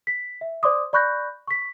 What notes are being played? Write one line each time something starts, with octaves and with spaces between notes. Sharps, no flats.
B6
E5
C5 D5 C6 D6 D#6
D5 B5 C#6 F#6 G6 A#6
C#6 B6